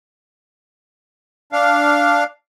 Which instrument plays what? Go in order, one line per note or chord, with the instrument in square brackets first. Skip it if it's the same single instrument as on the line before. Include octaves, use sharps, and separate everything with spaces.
[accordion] D4 F5